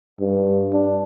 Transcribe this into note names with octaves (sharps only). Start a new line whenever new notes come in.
G2
D4